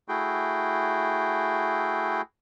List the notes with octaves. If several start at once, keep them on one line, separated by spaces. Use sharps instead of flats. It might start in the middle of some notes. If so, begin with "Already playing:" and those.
A3 E4 F#4 G#4 G5